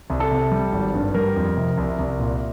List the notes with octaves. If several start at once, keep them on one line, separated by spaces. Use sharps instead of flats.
C2
A4
C3
G3
G#1
G2
G3 A#4
F2
C3
C2
C2
A#2